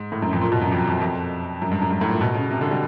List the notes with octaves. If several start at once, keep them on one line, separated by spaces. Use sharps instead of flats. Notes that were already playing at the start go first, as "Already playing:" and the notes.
Already playing: G#2
A2
F#2
F2
A#2
B2
F#2
F2
F2
F2
F#2
G2
F#2
G2
A2
A#2
B2
C#3
C3
D3
G3